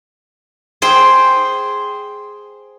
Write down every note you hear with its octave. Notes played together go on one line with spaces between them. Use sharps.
G#4 C5 G5